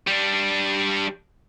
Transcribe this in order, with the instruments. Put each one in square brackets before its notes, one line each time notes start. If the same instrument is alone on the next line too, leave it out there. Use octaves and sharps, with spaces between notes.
[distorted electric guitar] G3 D4